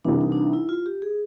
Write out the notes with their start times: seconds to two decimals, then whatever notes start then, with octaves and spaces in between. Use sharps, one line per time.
0.05 C2 C3 E3 D4
0.21 D#4
0.32 D4
0.37 D#4
0.53 E4
0.69 F4
0.86 G4
1.02 G#4